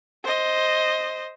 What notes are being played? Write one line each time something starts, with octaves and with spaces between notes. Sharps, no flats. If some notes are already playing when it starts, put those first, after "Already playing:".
C5 D#5